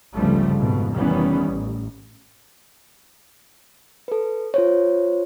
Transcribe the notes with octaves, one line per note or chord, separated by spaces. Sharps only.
G1 C#2 C#3 F3 G3 A3
F2 G#2 B2
F1 D#3 E3 G3 B3 C#4
A1
A4 B4
F4 C5 C#5